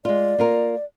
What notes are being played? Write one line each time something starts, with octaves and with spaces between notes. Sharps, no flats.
G#3 F4 D5
A#3 F4 A#4